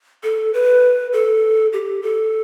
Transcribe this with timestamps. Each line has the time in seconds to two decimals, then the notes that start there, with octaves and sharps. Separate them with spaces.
0.23 A4
0.54 B4
1.13 A4
1.73 G4
2.02 A4